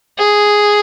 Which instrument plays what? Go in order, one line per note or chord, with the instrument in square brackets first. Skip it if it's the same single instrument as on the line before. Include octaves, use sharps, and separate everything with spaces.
[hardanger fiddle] G#4